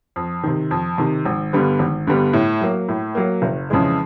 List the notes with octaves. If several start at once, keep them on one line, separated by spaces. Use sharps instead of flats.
F2
C3 D#3
F2
C3 D#3
G#1
G2 D3 G3 B3
G#1
G2 D3 G3 B3
A2
F#3 A#3
A2
F#3 A#3
F#1
F2 C#3 E3 G#3